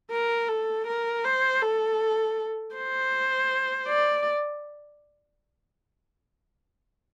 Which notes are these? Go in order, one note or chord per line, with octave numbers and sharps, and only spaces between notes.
A#4
A4
A#4
C5
A4
C5
D5